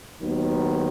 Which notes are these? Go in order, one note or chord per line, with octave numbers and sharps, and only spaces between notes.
D#2 D#3 F#3 B3